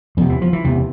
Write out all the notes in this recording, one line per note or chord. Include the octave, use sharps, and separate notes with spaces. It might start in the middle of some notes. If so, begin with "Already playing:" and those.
E2 C3 F3
E3
F3
E3
E2 C3